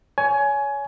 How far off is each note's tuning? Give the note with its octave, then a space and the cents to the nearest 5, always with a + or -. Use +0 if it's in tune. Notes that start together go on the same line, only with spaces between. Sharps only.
C#5 +20 G#5 +20